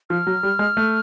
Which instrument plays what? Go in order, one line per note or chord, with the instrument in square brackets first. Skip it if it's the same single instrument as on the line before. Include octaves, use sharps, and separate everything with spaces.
[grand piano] F3 [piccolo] F6
[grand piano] F#3
G3
G#3
A3